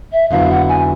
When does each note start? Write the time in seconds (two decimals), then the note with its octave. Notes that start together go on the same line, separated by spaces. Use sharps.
0.12 E5
0.31 F2 D3 F#3 B3 E4 F5
0.49 F#5
0.68 G#5